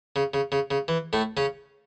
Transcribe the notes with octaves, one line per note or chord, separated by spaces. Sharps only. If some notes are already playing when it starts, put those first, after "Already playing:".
C#3
C#3
C#3
C#3
E3
A2 A3
C#3 C#4